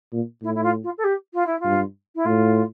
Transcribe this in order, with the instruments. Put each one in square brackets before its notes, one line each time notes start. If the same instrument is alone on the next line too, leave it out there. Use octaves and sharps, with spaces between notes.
[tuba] A#2
[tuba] A2 [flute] E4
[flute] E4
F4
F4
A4
G4
F4
E4
F4
[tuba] G2
[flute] E4
[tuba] A2 [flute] F4